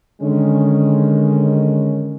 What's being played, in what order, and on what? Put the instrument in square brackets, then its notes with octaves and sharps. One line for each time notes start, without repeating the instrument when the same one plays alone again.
[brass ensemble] D3 D#3 G#3 C#4